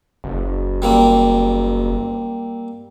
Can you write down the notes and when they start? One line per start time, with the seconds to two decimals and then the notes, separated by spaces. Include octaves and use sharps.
0.24 F#1
0.82 G3 A#3 C4